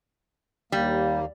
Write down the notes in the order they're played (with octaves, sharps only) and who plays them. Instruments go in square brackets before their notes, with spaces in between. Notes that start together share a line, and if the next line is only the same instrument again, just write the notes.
[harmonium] D#2 A#3 [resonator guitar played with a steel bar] G3